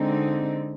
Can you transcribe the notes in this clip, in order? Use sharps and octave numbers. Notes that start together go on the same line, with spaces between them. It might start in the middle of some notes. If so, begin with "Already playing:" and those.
Already playing: D3 G#3 C4 D#4